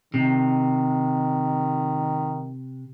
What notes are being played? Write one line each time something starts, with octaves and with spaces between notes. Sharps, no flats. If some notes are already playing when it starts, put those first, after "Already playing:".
C3 D#3